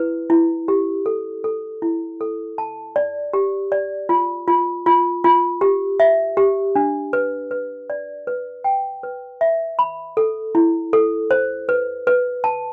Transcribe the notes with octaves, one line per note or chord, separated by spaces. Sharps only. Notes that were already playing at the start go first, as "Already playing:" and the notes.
Already playing: E4 B4
E4
G4
A4
A4
E4
A4
A5
D5
G4
D5
F4
F4
F4
F4
G4
E5
G4
D4
B4
B4
D5
B4
G5
B4
E5
B5
A4
E4
A4
C5
B4
B4
A5